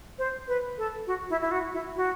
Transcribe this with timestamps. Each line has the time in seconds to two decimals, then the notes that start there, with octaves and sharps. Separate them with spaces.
0.19 C5
0.48 B4
0.78 A4
1.07 F#4
1.30 E4
1.42 E4
1.51 F#4
1.73 E4
1.96 F#4